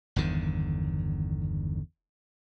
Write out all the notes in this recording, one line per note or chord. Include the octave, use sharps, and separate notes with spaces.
G1 E2 D3 D#3